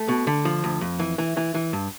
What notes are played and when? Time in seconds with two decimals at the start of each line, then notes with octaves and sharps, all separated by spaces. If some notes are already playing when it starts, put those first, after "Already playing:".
Already playing: A3
0.08 B2
0.27 D3
0.45 F3
0.64 D2
0.81 F2
1.00 E3
1.18 E3
1.37 E3
1.55 E3
1.73 G2